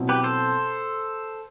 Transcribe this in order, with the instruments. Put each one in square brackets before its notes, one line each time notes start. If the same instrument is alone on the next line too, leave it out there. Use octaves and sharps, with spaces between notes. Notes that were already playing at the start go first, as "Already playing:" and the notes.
Already playing: [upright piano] B2 F#3 C4 E4
[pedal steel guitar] G4 B4
A4 C5